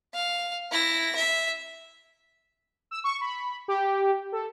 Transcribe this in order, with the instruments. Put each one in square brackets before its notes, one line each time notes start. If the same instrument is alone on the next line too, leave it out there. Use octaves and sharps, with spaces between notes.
[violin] F5
E4 A#6
E5
[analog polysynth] E6
C#6
B5
G4
A4